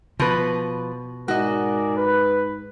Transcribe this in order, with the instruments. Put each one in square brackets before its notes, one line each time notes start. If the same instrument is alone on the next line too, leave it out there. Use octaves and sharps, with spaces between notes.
[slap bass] B2 [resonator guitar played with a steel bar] F3 B4
[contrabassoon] G#2 [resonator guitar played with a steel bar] F#4 D#5 [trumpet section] G#4 A#4 D5
[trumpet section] B4